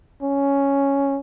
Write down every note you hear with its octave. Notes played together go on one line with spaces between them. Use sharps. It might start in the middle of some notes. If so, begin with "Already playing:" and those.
C#4